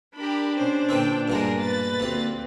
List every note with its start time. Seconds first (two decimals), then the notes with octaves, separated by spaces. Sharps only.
0.16 D4 G4 A#4 B5
0.56 B2 C#4 C5
0.89 A#2 D3 C4 E4 B4 G5
1.28 G2 B2 G#3 A#3 G#4 A#4
1.59 B4 A6
2.00 D2 A#3 C4 G4